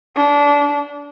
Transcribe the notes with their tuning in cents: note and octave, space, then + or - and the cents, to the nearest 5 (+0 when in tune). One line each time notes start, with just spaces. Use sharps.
D4 -25